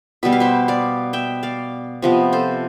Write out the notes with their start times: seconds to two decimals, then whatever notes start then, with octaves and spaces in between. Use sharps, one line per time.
0.23 B2 G3 B3 E5
0.32 F5
0.40 C5 E5
0.68 D5 F5
1.13 E5 G5
1.43 D5 F5
2.02 C3 F3 B3
2.33 A4 C5